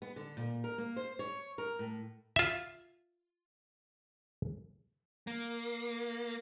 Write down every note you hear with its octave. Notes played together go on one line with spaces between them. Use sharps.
B3
D3
A#2
A#4
A#3
C5
C#5
A#4
A2
F4 E5
A#3